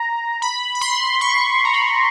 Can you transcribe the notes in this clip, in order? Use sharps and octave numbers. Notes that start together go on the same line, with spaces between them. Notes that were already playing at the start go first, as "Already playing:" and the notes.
Already playing: A#5
B5
B5
C6
C#6
A#5
B5